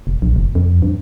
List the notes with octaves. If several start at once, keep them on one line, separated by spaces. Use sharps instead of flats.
F1
A#1
F1
F2
G2